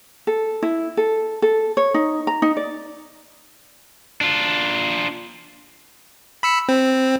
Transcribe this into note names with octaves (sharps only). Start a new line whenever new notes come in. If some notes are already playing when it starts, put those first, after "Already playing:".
A4
E4
A4
A4
C#5
D#4
A#5
D#4
D5
D4 F4
B5 E6 C#7
C4